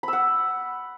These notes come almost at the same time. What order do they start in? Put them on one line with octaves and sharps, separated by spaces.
B5 E6 F#5